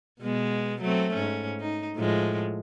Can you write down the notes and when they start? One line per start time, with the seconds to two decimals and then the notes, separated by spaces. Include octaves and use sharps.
0.21 B2 G#3 B3
0.81 F#3 A3 C4
1.13 G#2 C#4
1.60 D#4
1.96 A2 F3 G#3